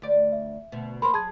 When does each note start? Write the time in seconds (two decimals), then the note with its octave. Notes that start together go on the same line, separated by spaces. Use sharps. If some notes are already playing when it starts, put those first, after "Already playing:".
0.02 D2 D5
0.32 E5
0.72 D2 B2
1.02 A#3 C5 B5 C6
1.13 F#3 G#4 A5 G#6